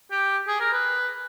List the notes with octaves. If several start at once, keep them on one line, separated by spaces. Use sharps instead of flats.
G4
G#4
A#4
B4